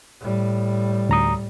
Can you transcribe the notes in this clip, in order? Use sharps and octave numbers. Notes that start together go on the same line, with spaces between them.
A2 G3
D2 A#5 D#6